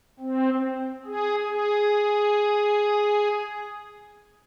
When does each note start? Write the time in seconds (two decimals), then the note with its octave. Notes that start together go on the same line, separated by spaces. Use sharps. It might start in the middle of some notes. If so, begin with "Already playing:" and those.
0.20 C4
1.06 G#4
1.49 G#4